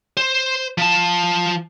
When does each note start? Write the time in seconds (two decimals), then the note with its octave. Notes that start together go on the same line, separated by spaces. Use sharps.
0.17 C5
0.78 F3 A5